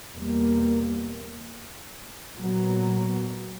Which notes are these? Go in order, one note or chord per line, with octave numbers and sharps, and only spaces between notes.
E2 B2 G3 A#3
A#2 F#3 B3